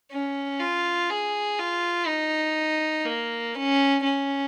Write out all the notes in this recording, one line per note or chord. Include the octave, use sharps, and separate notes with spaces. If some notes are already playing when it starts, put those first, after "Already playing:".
C#4
F4
G#4
F4
D#4
A#3
C#4
C#4